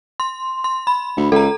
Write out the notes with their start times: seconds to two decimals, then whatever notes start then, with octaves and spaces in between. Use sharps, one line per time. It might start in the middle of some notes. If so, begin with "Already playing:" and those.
0.20 C6
0.64 C6
0.87 B5
1.17 D2
1.32 C#2 A4 A#5